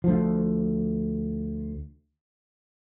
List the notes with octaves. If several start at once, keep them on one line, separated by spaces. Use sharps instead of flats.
D2 F3